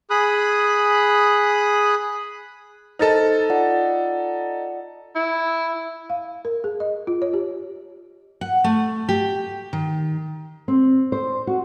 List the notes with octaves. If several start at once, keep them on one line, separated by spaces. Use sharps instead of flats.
G#4 B5 D#6 F#6
D#4 A4 C5 F6 A6
F4 D5 F#5
E4
F5
A#4
G#4
D#5
F4
C#5
G4
F#5
A3
G4
D#3
C4
C5
F#4